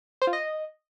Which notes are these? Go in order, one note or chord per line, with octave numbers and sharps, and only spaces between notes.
C5
F4
D#5